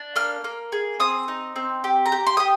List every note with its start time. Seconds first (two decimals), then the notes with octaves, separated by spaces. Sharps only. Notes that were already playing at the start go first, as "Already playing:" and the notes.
Already playing: D4
0.16 A#3 F6
0.44 A#3
0.72 G#4
1.00 C4 D#6
1.28 D#4
1.56 C4
1.84 G4
2.06 A#5
2.12 G4
2.27 C6
2.37 G4 D#6